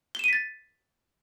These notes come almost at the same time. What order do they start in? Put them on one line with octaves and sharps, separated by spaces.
G7 E7 D#7 B6 A6